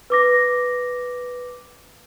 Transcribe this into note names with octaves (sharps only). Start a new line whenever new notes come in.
B4 D6 A#6